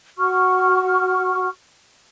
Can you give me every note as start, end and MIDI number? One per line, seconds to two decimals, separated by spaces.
0.18 1.47 66
0.18 1.47 78
0.18 1.47 85
0.18 1.47 89